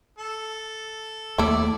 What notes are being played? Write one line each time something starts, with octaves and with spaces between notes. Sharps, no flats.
A4
D#2 A3 A#3 E4 A4 D5